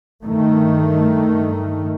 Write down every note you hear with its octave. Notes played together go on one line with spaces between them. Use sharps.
G2 D#3 A3